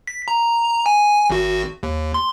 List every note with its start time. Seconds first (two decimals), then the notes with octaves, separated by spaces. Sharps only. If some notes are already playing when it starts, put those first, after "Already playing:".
0.07 B6
0.28 A#5
0.86 G#5
1.30 G#1 F#4
1.83 D#2
2.14 C6